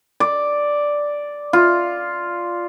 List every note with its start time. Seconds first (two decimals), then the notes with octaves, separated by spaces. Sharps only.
0.20 D5
1.53 F4